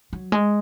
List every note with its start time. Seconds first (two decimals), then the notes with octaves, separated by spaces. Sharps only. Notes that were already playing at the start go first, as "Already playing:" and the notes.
0.13 F#3
0.32 G#3